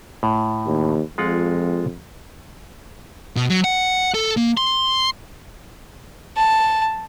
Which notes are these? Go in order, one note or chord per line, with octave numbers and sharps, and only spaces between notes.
A2
D#2
F2 G#3 F4 F#5
B2
F#3
F#5
A4
A#3
C6
A5